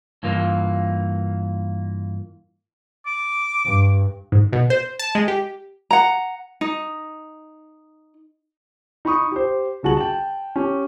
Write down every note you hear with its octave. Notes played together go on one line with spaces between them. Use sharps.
G2 E3 A#3 F4
D6
G2
G#2
B2
C5
A5
G#3
G4
F#5 A#5
D#4
D#4 B5 C#6 D#6
G4 C5
C#2 G3 F#4 G#4 A5 F#7
G5 A5
C#4 G4